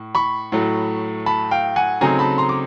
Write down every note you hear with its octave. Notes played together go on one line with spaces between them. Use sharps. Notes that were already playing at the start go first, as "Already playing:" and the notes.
Already playing: A2
B5 C#6
A2 F#3 A3
A5 B5
F5 G5
F#5 G#5
C#3 F#3 A3 C4 D#4 G#5 A#5
A5 B5
A#5 C6
D6